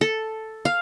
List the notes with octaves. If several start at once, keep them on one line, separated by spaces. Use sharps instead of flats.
A4
F5